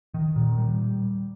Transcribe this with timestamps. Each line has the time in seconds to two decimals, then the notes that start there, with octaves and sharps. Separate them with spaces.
0.14 D#3
0.36 A#2
0.58 G3